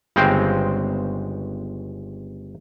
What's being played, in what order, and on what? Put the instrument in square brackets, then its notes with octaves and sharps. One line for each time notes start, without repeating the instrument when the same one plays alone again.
[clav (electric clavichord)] G1 C#3 G#3 C4 C5 G5